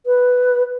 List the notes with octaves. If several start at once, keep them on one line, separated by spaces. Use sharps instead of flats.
B4